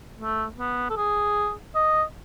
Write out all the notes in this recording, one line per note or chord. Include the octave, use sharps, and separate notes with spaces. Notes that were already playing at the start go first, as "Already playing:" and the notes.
A3
B3
A4
G#4
D#5